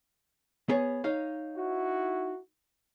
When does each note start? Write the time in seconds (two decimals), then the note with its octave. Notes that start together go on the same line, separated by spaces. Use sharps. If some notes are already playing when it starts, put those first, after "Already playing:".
0.69 B3 G#4 C#5
1.04 D#4 C#5 F5
1.57 E4 F#4